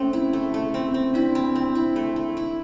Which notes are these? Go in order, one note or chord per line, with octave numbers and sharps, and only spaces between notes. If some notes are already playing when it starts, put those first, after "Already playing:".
Already playing: A3 C4 C#4
E4
A3
A3
C4
C4
D4 E4
C4
C4
E4
A3
A3
E4